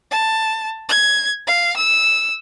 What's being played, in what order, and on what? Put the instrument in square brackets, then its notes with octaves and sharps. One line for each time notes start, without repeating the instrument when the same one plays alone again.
[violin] A5
G#6
F5
E6